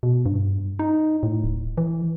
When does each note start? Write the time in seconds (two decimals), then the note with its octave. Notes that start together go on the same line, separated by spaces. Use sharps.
0.03 B2
0.26 G2
0.79 D#4
1.23 A2
1.44 D1
1.78 E3